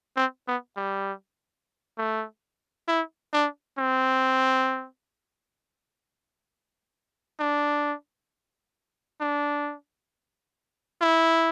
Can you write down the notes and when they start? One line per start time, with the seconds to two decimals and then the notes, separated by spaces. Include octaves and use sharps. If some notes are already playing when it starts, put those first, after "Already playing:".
0.16 C4
0.47 B3
0.76 G3
1.98 A3
2.88 E4
3.33 D4
3.78 C4
7.40 D4
9.20 D4
11.01 E4